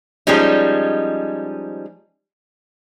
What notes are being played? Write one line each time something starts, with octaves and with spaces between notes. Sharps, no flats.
F3 G3 G#3 C#4 D#4